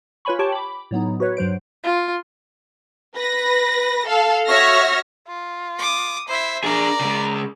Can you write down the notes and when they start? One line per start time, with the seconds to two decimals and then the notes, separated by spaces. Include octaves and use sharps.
0.25 F4 B4 C#5 G#5 B5 C#6
0.39 G4 C#5 G5 A5 C#6
0.52 B5 D6
0.91 A2 F#3 B3 D#4
1.20 F#4 B4 C#5
1.37 G2 F#3 C5 D7
1.83 F4
3.15 B4 A#6
4.06 A4 F5
4.46 F#4 C#5 E5 C#6 F6 A#6
5.27 F4
5.79 D6 D#6
6.29 E4 C5 E5
6.64 D4 G#4 A#4 D5 A#5
7.01 C#3 G#3